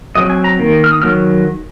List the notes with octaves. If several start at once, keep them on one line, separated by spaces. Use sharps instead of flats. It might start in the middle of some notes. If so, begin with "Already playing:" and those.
F#3 C4 D#5
G#5
A#5
D#3 A#3
F6
D#6
D#3 F#3 F6